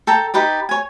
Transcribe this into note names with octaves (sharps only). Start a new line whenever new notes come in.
A4 G5 A5 A#5
D#4 G4 B4 D5
C#5 G#5